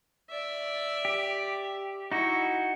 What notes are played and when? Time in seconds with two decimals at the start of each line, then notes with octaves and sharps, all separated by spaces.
0.29 D5 E5
1.05 G4
2.12 D#4 E4 F#4